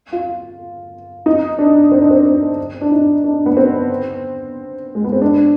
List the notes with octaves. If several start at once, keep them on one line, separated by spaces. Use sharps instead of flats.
F4
D#4
D4
C4
D4
C4
C4
D4
D#4
D4
B3
C4
G#3
B3
C4
D4